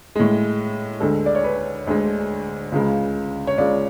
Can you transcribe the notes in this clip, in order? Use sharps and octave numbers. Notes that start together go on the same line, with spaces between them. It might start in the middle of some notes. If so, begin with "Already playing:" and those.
A2 G#3
D2 D3 G#3 A4
D5
C#5
B4
D2 D3 G#3
C#2 C#3 G#3
C#5
C#2 C#3 G#3 D5